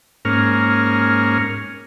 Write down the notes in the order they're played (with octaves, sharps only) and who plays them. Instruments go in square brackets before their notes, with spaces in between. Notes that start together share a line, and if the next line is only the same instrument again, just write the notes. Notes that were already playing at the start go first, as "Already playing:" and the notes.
[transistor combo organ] G#2 A#3 C#4 F6